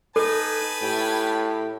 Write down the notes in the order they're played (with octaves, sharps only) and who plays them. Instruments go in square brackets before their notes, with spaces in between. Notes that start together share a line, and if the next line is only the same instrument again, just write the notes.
[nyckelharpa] D#4 [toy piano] A4 [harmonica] B4 G#5 A5
[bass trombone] A2 [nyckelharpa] G4 B5